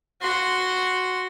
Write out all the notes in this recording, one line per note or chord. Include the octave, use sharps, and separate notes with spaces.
F#4 C6